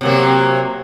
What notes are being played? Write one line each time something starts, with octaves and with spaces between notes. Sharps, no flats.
C3 F#3 A#3